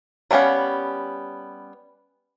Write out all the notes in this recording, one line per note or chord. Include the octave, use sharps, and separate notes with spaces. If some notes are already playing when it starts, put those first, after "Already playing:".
F#3 G3 B3 C#4 F5